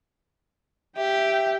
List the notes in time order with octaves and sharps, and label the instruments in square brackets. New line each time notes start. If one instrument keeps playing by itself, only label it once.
[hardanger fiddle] G4 [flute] E5 [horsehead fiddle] G5